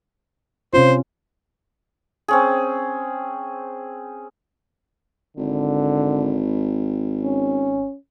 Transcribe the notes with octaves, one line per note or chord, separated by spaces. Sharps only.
C3 C#4 F4 C5
C4 C#4 G#4
G#1 D3
C#4